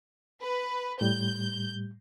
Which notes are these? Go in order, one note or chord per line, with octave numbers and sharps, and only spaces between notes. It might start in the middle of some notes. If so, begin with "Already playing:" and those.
B4
A2 G3 G6